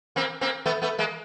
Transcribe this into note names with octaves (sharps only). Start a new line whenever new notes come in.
A#3 C4
A#3 C4
A3 B3
A3 B3
G#3 A#3